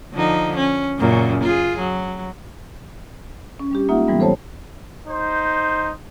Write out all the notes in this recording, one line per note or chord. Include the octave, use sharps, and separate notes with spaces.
D3 F3 D#4
C#4
F#2 A#2 C#3
F4 G#4
F#3
C#4
G3 D4 G4
G#3 A#3 D#4 F4 E5 F#5
A2 E3 F#3 G3 B3
A4 C5 C#5 A5
D#4 C5